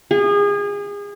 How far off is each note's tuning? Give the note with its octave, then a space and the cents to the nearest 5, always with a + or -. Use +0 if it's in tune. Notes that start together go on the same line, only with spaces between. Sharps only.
G#4 -30